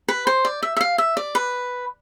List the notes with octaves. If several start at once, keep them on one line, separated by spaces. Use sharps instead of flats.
B4
C5
D5
E5
E5
F5
E5
D5
B4